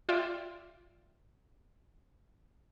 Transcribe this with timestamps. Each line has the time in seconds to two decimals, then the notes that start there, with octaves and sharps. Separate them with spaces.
0.09 F4 D5 E5 G5